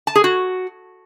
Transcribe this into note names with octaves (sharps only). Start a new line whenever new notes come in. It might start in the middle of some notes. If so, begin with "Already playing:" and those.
A5
G#4
F#4